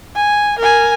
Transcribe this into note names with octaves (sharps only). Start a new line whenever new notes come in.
G#5
A#4 G#5